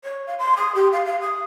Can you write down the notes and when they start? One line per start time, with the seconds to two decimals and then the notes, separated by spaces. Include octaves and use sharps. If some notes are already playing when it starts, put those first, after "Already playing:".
0.04 C#5
0.27 F5
0.39 C6
0.57 D#6
0.75 G4
0.92 F5
1.05 F5
1.21 D#6